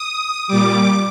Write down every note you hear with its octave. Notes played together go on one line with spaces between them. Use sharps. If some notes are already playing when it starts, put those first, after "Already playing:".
Already playing: D#6
A#2 G3 D6